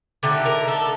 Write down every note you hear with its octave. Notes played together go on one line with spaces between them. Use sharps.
D3 A3 D#4 G4
A#4
A4